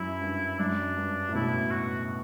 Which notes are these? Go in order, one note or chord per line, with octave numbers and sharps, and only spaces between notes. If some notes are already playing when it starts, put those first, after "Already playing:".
Already playing: F#2 E4
G2
F#2 D4
G2
A2
B2 E4
F#4